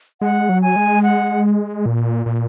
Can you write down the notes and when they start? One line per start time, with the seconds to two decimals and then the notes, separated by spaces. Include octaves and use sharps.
0.21 G#3 F#5
0.49 F#3
0.62 G#5
0.76 G#3
1.03 F#5
1.86 A#2
2.26 A#2